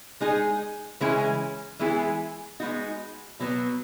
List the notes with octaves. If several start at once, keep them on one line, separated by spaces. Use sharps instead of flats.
G#3 D#4 G#4
C#3 E3 G#3 C#4 E4
E3 G#3 B3 E4 G#4
G#3 B3 D#4 F#4
B2 F#3 B3